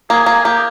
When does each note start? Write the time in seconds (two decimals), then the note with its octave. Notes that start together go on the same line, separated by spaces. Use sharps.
0.10 A#3 G#4
0.26 A#3 G#4
0.44 A#3 G4